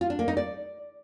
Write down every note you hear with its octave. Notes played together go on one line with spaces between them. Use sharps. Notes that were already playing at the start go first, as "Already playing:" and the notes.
F4
D4
A#3
D#4
D5